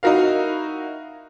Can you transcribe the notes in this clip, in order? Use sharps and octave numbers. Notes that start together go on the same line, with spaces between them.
D#4 E4 F#4 A#4 F5